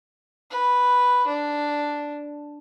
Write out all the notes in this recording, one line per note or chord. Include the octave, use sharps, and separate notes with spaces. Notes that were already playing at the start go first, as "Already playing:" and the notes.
B4
D4